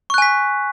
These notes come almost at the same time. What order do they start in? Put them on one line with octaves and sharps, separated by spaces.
C#6 F#6 G#5 B6